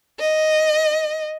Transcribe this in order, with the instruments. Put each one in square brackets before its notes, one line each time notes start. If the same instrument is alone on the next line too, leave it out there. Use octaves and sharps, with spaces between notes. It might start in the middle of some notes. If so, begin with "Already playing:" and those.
[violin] D#5